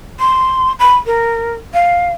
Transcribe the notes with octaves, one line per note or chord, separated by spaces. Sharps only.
C6
B5
A#4
F5